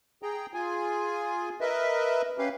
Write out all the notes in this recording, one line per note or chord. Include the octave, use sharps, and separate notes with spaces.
G#4 G5 A#5
F4 G#4 G#5
A#4 B4 D#5 E5
C#4 G4 B4 F5